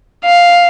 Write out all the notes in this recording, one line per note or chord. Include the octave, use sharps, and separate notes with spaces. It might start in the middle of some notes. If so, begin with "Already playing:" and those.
F5